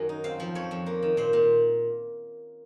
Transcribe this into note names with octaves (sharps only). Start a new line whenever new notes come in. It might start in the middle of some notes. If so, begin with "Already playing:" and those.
Already playing: F#2 D#3 F#3 A#4 G#5
D#4
C4 F5
F3
F2 C#5
F2
A#3
D#3
A#2 C5
A#2